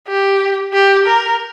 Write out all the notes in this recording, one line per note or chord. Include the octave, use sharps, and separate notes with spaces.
G4
G4
A#4